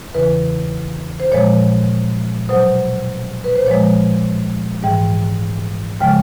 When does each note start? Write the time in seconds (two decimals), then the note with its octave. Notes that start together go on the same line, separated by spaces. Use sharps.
0.14 E2 C#3 E3 B4
1.20 C5
1.32 A#2 F3 G#3 C#5
2.49 B2 F#3 C5
3.44 B4
3.55 C5
3.66 A#2 F3 G#3 C#5
4.83 G#2 E3 G3 G5
6.00 C#3 F3 G#3 G5